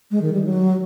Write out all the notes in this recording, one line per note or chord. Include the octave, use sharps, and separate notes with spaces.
G#3
D#3
G3
F#3